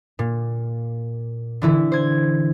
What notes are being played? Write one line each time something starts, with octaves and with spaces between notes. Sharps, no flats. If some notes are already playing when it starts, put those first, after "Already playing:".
A#2
D3 E3 E4
C5 G#6